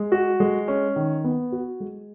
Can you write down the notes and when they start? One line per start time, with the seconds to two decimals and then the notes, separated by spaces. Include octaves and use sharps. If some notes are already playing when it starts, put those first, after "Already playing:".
Already playing: G#3
0.12 F#4
0.40 G#3
0.68 C#4
0.96 D#3
1.24 B3
1.52 F#4
1.80 G#3